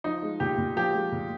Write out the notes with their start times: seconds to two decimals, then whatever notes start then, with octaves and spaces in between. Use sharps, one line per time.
0.04 F3 D#4
0.22 G#3
0.40 A#2 G4
0.58 A#2
0.77 F3 G4
0.94 G#3
1.12 A#2